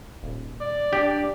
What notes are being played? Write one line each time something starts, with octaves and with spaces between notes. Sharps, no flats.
D#1
D5
D4 G4